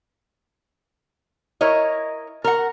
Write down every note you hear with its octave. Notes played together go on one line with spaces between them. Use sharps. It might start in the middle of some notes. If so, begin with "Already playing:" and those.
E4 A#4 C#5 D#5
A#4 F#5